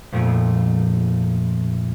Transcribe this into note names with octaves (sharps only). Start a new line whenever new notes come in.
F2 A#2 F3 A3